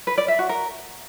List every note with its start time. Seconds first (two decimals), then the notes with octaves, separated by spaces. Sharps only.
0.07 B4
0.18 D5
0.28 E5
0.39 F#4
0.49 A#4